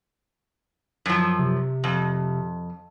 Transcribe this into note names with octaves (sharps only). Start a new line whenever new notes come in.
F#2 F3
C3
F2